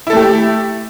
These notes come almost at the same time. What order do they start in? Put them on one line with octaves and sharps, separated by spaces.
E4 A4 A3 G4